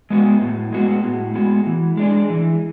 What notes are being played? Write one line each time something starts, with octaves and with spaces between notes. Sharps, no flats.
G#3 B3 F#4
A2
G#3 B3 F#4
A2
G#3 B3 F#4
E3
G#3 D4 G#4
E3